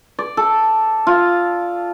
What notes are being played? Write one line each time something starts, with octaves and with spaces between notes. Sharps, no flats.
D5
A4
F4